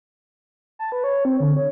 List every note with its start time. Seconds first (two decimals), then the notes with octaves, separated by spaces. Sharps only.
0.79 A5
0.92 B4
1.04 C#5
1.25 C4
1.40 D3
1.57 C#5